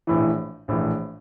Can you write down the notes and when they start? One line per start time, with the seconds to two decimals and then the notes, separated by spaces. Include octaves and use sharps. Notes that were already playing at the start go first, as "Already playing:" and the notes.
0.07 A#1 A2 E3
0.68 A#1 A2 E3